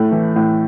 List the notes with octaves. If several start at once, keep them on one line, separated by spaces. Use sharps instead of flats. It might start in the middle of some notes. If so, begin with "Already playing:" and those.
Already playing: A2 A3
E3
A2